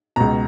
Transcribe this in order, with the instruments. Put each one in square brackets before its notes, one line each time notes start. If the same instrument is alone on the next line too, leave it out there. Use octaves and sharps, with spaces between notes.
[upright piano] C#2 B2 A#5